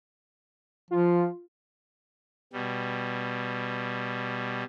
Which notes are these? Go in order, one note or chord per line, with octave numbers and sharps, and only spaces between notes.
F3 F4
B2 G3